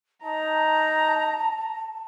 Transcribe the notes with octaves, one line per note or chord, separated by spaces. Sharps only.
D#4 A5 A#5